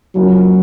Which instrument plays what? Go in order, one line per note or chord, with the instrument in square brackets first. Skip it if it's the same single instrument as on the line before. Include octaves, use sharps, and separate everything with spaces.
[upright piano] C#2 C#3 F3 A#3 C#4 [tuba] F#3